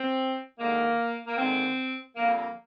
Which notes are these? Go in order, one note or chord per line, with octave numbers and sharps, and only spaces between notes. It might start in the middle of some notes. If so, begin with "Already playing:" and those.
Already playing: C4
D#2 D3 G#3 A#3
A#3
D#2 D3 G#3 C4
F2 D3 G3 A#3
A#3